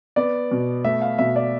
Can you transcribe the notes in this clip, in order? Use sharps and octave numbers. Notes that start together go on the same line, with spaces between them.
B3 D5
B2
A3 E5
F5
B2 E5
D5